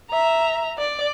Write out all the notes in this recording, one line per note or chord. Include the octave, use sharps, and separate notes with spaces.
E5 A#5
D5